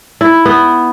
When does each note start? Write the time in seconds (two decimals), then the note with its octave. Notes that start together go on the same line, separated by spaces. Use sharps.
0.21 E4
0.46 B3